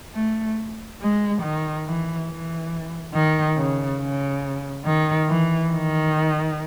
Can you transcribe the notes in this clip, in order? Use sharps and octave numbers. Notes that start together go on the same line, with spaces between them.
A3
G#3
D#3
E3
E3
D#3
C#3
C#3
D#3
E3
D#3